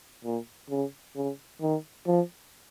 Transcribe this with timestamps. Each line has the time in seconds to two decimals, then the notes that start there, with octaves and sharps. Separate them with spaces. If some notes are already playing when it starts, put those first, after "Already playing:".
0.24 A#2
0.70 C#3
1.16 C#3
1.62 D#3
2.06 F3